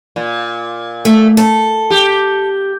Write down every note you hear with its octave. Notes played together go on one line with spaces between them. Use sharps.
A#2
A3
A4
G4